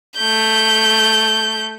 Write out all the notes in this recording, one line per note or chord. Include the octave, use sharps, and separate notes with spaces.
A3 G6